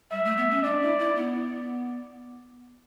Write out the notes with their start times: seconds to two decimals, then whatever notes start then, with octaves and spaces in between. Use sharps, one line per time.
0.11 G3 E5
0.25 A3
0.37 B3
0.50 C#4
0.63 D4 D5
0.82 E4
0.99 E4
1.16 B3